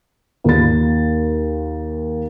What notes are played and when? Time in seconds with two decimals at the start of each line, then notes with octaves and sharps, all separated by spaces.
0.44 D#2 A#3 A6